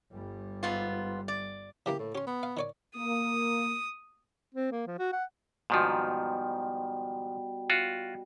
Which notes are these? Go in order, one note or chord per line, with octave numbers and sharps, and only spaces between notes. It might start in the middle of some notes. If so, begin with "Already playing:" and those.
G1 G3
G#2 B3 F4
D5
C#3 E3 A#3 G4
A2
C#4 G4 C6
B3
F5
D#3 C#5 D5
A#3 D#6
C4
A#3
F3
F#4
F#5
G#2 B2 D#3 F3 G3
F4 F#4